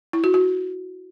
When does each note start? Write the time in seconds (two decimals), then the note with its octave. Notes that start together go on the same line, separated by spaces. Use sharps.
0.13 E4
0.24 F#4
0.34 F#4